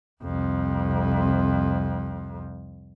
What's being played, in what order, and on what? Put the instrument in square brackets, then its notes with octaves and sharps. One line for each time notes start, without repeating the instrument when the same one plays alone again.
[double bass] C2 F2